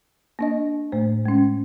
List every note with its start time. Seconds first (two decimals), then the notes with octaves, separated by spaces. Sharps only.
0.39 A#3 D4 D#5
0.92 A2 A3 C5
1.26 G#3 C#4